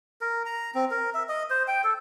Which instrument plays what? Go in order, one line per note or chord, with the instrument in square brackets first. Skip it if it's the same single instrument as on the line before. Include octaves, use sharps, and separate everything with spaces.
[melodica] A#4
A#5
C4
A#4
E5
D#5
C5
G5
A4